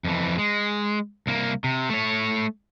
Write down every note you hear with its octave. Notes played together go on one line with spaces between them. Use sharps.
F2 E3
G#3
C2 A#3
C3
A3 C#5